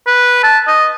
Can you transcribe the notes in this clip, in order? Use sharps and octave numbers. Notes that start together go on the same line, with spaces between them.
B4
A5
D#5